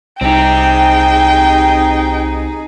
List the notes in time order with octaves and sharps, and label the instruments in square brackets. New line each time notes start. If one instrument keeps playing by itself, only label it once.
[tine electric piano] C2 [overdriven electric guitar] C4 G4 [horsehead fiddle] D#4 G#4 [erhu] G5